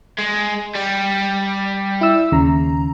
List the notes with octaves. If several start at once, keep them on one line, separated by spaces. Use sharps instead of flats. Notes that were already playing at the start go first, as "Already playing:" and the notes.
G#3
G3
E4 E6
D#2 C#3 A#5